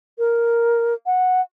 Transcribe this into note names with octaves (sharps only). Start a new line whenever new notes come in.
A#4
F#5